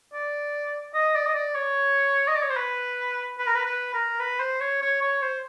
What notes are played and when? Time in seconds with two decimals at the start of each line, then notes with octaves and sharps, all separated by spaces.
0.13 D5
0.94 D#5
1.15 D5
1.26 D#5
1.35 D5
1.55 C#5
2.28 D#5
2.36 D5
2.42 C#5
2.50 C5
2.57 B4
3.39 B4
3.47 A#4
3.55 B4
3.66 B4
3.94 A#4
4.20 B4
4.40 C5
4.61 C#5
4.82 C#5
5.02 C#5
5.22 C5